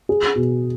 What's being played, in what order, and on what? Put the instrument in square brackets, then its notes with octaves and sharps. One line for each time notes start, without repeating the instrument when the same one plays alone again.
[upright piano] G#4
B2